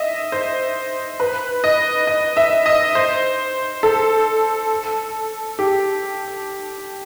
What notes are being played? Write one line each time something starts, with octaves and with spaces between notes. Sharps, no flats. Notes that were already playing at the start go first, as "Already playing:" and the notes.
Already playing: D#5 E5
C5
B4
D#5
D#5
E5
D#5
C5
A4
G4